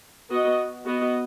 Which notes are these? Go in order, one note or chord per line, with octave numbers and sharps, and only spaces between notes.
B3 F#4 D#5
B3 F#4 D#5